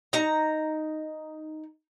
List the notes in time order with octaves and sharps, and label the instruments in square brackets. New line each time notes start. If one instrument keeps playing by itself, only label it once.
[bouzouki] D#4 A#5